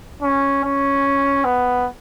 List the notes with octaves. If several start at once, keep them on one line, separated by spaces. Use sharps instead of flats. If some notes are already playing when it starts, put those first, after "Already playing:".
C#4
C#4
B3